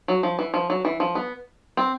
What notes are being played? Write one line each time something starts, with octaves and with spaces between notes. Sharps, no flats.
F#3
F3
E3
F3
F#3
E3
F3
B3
C4